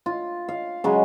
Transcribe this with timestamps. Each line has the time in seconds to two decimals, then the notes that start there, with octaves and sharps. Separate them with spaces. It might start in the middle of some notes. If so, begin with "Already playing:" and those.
0.06 F4
0.49 F5
0.84 C#3 F#3 G#3